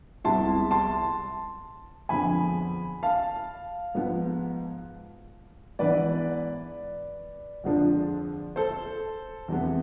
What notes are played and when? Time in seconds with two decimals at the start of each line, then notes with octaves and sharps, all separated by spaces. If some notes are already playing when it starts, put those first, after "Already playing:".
0.24 C2 C3 G#3 B3 E4 A5 C6
0.71 A5 C6
2.09 F2 D3 G#3 B3 G#5 B5
3.03 F5 A5
3.95 G#2 F3 B3
5.79 G#2 E3 B3 B4 D5
7.64 F2 D3 F3 G#3 D4
8.56 A4 C5
9.48 E2 C3 G#3 B3